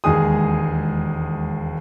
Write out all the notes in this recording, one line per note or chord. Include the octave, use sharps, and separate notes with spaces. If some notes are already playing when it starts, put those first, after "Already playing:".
E1 D#2 G#3 G#4 D#6